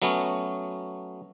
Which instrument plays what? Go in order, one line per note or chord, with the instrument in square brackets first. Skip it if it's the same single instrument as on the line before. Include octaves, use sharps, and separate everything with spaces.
[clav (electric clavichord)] F#3 A3 B3 C#4